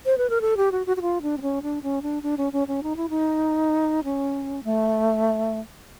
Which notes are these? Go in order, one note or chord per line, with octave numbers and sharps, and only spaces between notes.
C5
B4
A#4
A4
G4
F#4
F#4
F#4
F4
D4
C4
C#4
D4
C#4
D4
D4
C#4
C#4
C#4
D#4
E4
D#4
C#4
A3